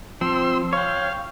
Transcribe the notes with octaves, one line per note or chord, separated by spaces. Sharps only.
F3 C4 C6 E6
C#5 F5 G5